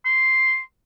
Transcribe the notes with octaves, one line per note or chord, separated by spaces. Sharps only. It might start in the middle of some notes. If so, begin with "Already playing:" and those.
C6